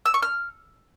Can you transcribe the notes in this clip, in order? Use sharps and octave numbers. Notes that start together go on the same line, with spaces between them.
E6
C#6
F6